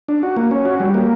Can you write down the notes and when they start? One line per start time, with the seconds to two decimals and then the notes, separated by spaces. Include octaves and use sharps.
0.08 D4
0.23 F#4
0.36 A#3
0.51 C#4
0.65 F#4
0.80 G3
0.94 A#3